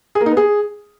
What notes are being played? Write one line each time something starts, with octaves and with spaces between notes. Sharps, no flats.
G#4
A#3
D#4
B3
G#4